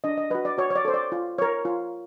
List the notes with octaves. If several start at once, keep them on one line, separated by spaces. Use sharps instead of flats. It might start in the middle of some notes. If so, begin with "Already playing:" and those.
D4 D#5
D#5
F#4 B4 D#5
D5
F#4 C#5
C#5
D5
A4 C5
D5
F4
A#4 C#5
F4